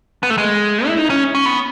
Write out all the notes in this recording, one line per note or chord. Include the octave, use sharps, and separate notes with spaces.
B3
A3
G#3
E4
D#4
C#4
C#4
B3